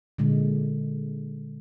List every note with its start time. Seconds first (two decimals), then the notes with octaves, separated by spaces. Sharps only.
0.18 A#2 D3 G#3